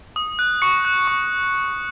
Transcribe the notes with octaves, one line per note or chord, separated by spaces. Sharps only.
D#6
F#6
C#6 C#7
F#6
C#6